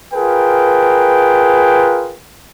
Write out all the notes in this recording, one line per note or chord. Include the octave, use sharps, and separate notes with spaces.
F4 G#4 A#4 B4 G5